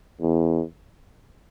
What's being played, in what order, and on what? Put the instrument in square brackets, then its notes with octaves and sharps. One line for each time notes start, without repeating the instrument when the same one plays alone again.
[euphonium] E2